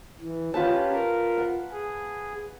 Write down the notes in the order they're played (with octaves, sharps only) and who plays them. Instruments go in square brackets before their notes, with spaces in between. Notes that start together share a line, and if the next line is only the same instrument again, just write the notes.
[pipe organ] E3
[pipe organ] C#4 G4 [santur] F4 B4 A5
[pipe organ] A#4
[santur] F#5
[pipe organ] G#4